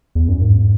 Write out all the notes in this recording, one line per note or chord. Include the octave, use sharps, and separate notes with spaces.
E2
F#2
G#2